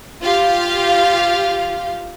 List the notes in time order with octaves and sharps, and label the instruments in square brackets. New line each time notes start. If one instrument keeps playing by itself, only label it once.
[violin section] F4 G4 F5